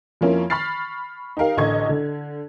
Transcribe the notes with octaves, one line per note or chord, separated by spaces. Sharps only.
F2 F3 A#3 C#4 E4
B5 C#6 F6 A6 C7
D#4 G4 A#4 F5
A1 D3 D#5 C#6 G#6
D3